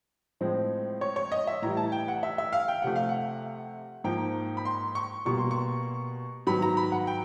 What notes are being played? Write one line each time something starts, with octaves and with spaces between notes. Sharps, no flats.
A2 F3 G#3 C4
C#5
C#5
D#5
E5
A2 E3 G3 A#5
A5
G5
F#5
E5
E5
F5
G5
C3 F3 A3 F#5
F5
F#5
G#2 F3 A#3 G5
B5
C6
C#6
B2 G3 A#3 C#6
C6
C#6
G#2 D#3 F#3 B3 B5
A#5
B5
F#5
G5